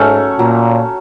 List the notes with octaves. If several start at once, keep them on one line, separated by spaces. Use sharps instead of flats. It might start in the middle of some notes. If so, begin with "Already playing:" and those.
Already playing: G#2 F#3 A3 C#4
A#2 F#3